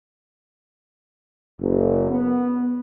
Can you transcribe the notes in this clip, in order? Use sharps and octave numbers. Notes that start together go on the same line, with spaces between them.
F#1
B3